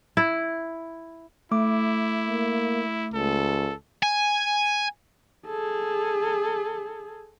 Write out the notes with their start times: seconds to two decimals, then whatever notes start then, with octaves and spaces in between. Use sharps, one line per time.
0.17 E4
1.51 A3 E4 D6
2.27 A#3
3.14 C#2 A4
4.03 G#5
5.46 G#4 A4